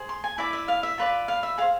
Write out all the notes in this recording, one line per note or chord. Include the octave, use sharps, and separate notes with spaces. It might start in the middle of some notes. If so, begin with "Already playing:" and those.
Already playing: G#4 C5
C6
G#5
E4 B4 D5 E5
E5
F5
E5
F4 B4 D5
F5
E5
G#4 C5 F5